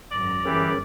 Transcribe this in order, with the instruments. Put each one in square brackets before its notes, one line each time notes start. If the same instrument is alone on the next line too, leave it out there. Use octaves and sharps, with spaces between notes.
[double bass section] G#1 F#2 [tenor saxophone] D5 [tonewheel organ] A#5
[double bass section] G1 [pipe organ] E3 G4 [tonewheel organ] C#4 G#4 A#4